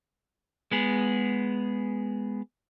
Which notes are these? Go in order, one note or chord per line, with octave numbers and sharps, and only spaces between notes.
G#3 B3 G#4